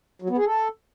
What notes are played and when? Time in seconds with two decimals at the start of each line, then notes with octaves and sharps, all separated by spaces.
0.22 F#3
0.30 B3
0.38 G#4
0.46 A4